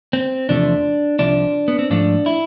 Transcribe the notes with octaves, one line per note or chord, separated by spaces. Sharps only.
C4
E2 C3 F3 A3 D4
C2 C3 F3 D4
B3
C4
G#2 F3 A3 D4
E4